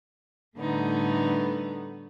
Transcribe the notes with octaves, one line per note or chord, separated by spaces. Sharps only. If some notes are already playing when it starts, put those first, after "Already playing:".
A2 D3 G3 A3 B3 D#4